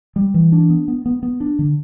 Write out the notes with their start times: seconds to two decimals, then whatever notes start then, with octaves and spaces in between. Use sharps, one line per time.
0.16 G3
0.34 E3
0.52 D4
0.69 B3
0.88 B3
1.06 B3
1.23 B3
1.40 D4
1.59 D3